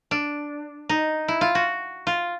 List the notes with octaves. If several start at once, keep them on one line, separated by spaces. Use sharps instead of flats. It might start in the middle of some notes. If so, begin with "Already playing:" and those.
D4
D#4
E4
F4
F#4
F4